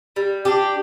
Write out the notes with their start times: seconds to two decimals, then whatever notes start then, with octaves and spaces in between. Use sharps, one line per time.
0.16 G3
0.45 D4 G4